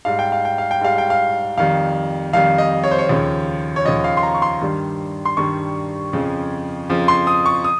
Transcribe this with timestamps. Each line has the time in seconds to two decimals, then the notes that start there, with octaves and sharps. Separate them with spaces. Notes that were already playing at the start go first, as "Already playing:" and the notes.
0.05 G#2 G3 F5
0.19 G5
0.32 F5
0.45 G5
0.58 F5
0.71 G5
0.81 G#2 G3 F5
0.98 G5
1.10 F5
1.57 F2 D#3 G3 F5
2.33 F2 D#3 G3 F5
2.58 D#5
2.84 C#5
2.91 C5
2.98 C#5
3.09 D#2 C#3 F3
3.76 C#5
3.85 D#2 C#3 F3 D#5
4.04 F5
4.17 C6
4.23 A#5
4.34 C#6
4.42 C6
4.61 G2 D#3 G3
5.25 C6
5.37 G2 D#3 G3 C#6
6.13 F2 C#3 F3
6.89 F2 C#3 F3
7.08 C6
7.27 D#6
7.46 C#6
7.64 D#6